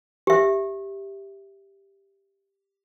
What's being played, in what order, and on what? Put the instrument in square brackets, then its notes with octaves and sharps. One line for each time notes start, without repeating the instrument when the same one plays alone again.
[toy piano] G4 E5